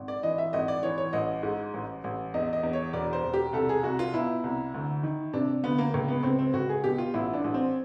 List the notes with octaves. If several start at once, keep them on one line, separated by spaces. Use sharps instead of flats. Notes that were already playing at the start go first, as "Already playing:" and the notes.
Already playing: G#1
D5
E3 D#5
E5
G#1 D#5
D5
E3 C#5
C#5
A1 D#5
G#2
A1
A1
E2 D#5
D#5
E2
C#5
E1 D5
C5
E1
G4
C2 A4
G#4
C2 F#4
F4
B2 E4
C2
D2
D#3
C3 D4
D2 B3
A#3
C#2 A#3
B3
C#2 C4
C4
C#2 F#4
G#4
B2 G4
F4
A1 E4
D4
A1
C4